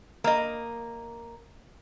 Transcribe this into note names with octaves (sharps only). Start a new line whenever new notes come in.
A#3 D#5